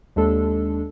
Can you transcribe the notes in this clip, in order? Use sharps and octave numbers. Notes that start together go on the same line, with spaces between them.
D#2 G#3 D4 A4